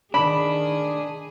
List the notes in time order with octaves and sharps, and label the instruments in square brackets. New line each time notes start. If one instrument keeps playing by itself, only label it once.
[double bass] D#3 [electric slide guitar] D4 [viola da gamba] G#4 [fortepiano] B5